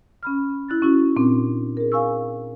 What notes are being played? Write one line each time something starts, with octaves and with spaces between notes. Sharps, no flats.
C#4 B5 F6
E4 F#6 A6
C#4 E4 F#4
A#2 C4 D4
G#4 A#4
F5 G#5 C#6 E6